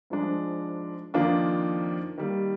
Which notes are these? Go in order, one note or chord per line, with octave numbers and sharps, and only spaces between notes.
G#2 F3 G#3 D4
F2 D#3 A#3 D4 F4
D#3 G3 A#3